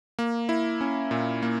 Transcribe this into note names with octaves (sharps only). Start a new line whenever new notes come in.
A#3
E4
C#4
A#2
A#3